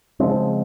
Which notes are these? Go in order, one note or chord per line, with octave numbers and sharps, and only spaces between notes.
C#3 F3 G#3 C4